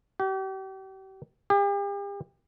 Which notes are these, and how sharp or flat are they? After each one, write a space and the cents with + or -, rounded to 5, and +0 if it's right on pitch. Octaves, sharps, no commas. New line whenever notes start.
G4 -40
G4 +40